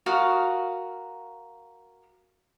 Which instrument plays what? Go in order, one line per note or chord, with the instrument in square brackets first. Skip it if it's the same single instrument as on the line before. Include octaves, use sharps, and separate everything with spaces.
[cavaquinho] F#4 A#4 F5 D#6